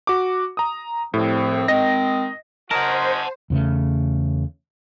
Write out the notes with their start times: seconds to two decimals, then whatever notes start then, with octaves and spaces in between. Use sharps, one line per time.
0.07 F#4 D6
0.57 A#5 D#6
1.14 C2 A2 F3 C4
1.68 D#3 G#3 C4 D#5 A#6
2.71 C#4 F#4 A#4 C5 D#5 F#5 A5
3.50 E2 C#3 A3